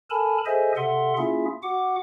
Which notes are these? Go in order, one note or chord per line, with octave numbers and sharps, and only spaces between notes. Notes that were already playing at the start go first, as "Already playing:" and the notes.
A4 A#4 G#5 A5 B5
G#4 A4 C5 D#5 E5 G#5
C3 A4 E5 F#5 C6
A#3 C#4 E4 F4 G#4 E5
F#4 F#5 D6